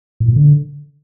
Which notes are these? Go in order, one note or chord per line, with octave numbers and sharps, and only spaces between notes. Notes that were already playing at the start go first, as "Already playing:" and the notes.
A2
A#2
D3